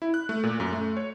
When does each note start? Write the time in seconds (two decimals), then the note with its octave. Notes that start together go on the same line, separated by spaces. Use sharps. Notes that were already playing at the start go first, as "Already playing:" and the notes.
0.02 E4
0.14 F#6
0.29 A3
0.43 A#2
0.60 F#2
0.73 A3
0.97 C#5